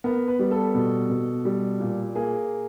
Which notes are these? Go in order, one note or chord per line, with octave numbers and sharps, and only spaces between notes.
B3 A#4
B4
G3
A4
B2
B2
G3
A#2
A#3 G#4